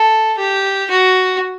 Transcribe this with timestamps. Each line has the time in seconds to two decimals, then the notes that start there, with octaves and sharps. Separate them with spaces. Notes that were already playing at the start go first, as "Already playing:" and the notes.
Already playing: A4
0.38 G4
0.90 F#4